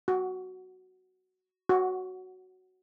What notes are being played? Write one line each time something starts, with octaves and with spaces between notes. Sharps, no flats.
F#4
F#4